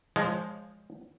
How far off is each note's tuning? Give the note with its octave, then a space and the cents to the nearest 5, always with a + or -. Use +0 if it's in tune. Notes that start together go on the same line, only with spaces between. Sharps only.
F3 +0 G#3 +0 C#5 +20